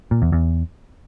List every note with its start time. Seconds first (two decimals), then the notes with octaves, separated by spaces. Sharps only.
0.11 A#2
0.22 E2
0.32 E2